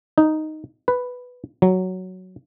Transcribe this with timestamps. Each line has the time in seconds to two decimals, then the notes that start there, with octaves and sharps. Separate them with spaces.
0.18 D#4
0.88 B4
1.62 F#3